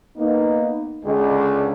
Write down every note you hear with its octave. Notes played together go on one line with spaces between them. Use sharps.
A#3 B3 D#4
C#2 D3 G#3